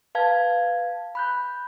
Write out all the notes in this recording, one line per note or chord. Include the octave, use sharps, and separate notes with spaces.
B4 F5 A5 G#6
B5 F#6 G6